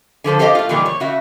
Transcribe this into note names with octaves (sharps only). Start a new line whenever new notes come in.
D3 F3 A4 C5
G4 A4 C5 D5 D#5 F5
A3 F4
A#2 D#3 E3 G3 A#3
C#5
C#3 F#4 E5